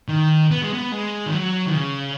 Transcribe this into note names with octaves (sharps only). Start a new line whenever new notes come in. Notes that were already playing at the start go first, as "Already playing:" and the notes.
D#3
B3
G#3
B3
G#3
D#3
F#3
D#3
C#3